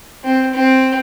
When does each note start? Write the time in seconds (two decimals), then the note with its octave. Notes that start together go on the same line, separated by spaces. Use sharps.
0.24 C4
0.54 C4